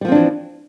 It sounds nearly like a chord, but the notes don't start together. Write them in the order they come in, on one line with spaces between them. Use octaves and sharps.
G3 F3 C4 D4 E3